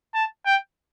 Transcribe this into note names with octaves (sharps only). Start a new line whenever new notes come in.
A5
G5